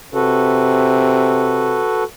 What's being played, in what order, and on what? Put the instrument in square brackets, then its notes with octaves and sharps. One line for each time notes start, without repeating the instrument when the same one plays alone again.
[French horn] C3 [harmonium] F#4 A4 B4